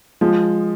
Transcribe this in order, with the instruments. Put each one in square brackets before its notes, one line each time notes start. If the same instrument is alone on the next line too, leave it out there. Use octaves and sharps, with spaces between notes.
[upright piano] F3 [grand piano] G#3